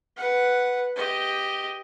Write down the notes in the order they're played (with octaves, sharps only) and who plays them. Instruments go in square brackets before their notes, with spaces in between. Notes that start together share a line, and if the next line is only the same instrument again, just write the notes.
[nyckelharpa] B4 F#5
G4 D#5